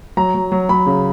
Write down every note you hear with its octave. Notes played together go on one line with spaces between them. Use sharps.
F#3 A#5
F#3
F#3
F#3 B5
C#3